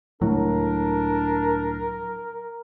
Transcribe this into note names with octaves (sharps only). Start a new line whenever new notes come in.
C#2 A2 F#3 D4 A#4